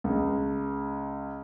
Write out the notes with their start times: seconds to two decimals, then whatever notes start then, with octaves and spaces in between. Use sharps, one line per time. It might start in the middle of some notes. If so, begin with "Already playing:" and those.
0.04 C#2